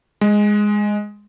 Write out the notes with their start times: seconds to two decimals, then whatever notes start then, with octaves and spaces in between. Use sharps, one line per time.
0.21 G#3